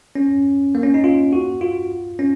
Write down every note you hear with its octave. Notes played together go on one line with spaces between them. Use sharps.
C#4
A#3
C#4
D#4
F4
F#4
F4
C#4